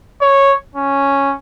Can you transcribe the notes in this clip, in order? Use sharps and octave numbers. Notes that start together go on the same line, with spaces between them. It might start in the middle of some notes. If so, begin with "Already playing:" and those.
C#5
C#4